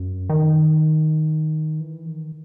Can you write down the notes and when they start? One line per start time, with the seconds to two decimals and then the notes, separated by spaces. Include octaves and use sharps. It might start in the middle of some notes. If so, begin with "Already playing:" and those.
Already playing: F#2
0.30 D#3
1.80 E3
2.05 D#3